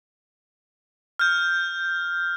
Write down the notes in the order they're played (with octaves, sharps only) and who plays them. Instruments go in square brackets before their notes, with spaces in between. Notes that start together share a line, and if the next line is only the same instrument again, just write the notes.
[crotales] F6 G6